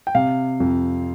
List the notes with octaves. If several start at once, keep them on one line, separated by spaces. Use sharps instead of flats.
G5
C3 F5
F2